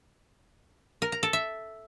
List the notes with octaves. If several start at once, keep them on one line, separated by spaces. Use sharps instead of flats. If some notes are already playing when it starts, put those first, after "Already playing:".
A#4
A#5
A4
E5